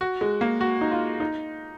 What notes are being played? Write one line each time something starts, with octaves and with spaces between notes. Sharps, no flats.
F#4
G#3
A#3
F#4
D#4
F4
D#4